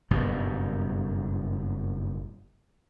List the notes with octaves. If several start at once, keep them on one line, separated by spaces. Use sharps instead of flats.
F#1 G2 B2 G3